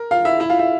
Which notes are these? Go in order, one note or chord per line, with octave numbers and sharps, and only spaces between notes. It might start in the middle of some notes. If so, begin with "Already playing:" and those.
Already playing: A#4
F4 F5
E4 E5
E4 E5
F4 F5
E4 E5